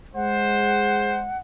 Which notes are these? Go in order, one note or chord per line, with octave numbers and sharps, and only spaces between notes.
G#3 C5 F#5